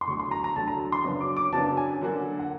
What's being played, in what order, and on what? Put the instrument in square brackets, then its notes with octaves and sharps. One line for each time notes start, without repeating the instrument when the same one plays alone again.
[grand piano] C6
[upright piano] D2 D3 F#3 [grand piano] C#6
[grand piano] C6
A#5
A#5
[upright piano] D2 D3 F#3 [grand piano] A5
[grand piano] A#5
C6
[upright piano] F#2 C#3 F#3 B3 D4
[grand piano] D6
D6
[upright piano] F#2 C#3 F#3 B3 D4 [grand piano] A5
[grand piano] G#5
[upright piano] D3 F#3 A#3 D4 F#4
[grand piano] F#5